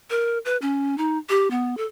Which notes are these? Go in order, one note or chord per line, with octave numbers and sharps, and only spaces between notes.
A#4
B4
C#4
D#4
G4
B3
A4